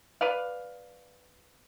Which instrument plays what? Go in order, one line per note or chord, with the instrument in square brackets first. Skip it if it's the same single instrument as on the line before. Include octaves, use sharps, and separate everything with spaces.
[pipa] B4 D5 F5